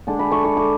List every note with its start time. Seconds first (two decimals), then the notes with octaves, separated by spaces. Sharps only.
0.07 D3 G#3 D4
0.19 B5
0.32 C#6
0.44 C#6
0.57 D6